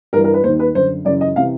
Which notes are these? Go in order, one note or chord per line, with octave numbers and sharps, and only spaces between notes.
G2 E3 A#4
A#4
B4
D#2 C5
D#3
B4
F#2 D3 C5
F#2 C#3 E3 D5
D#5
C3 E3 F5